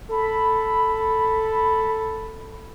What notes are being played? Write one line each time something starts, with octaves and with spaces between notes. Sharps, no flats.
A4 B5